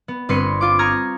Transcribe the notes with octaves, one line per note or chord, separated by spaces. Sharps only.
B3
G1 C4 B4 C6 C#7 D#7
F4 D6
A#5 C#6 D#6 F6 G#6